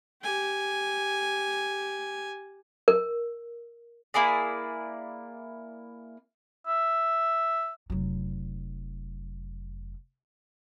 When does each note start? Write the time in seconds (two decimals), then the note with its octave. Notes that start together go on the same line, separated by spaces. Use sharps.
0.22 G4 G#5
2.88 A#4
4.14 A#3 E4 G#4 D5
6.67 E5
7.90 F1 F#3